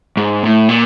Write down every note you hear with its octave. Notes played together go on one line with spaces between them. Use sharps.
G#2
A2
A#2